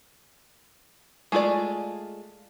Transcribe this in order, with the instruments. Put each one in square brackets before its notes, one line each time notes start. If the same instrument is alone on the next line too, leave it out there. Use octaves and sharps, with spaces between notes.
[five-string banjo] G#3 A3 F4 G#4 D5